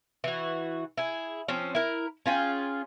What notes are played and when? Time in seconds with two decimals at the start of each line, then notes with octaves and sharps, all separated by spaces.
0.24 E3 F#4
0.97 E4 G#4
1.48 F3 C4 C#4
1.75 E4 A#4
2.26 C#4 F4 G#4 G5